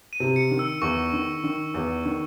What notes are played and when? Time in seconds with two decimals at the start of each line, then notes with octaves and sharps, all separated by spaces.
0.13 D#7
0.20 C3
0.36 C#7
0.51 D#3
0.59 E6
0.82 E2 C#6
1.13 D#3
1.44 D#3
1.74 E2
2.05 D#3